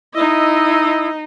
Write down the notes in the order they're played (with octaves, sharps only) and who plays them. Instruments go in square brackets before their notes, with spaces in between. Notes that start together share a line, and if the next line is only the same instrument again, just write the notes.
[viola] D#4 D#5 [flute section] E4 D#6 E6